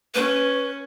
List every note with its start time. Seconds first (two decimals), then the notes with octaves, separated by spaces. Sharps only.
0.14 C#4 B4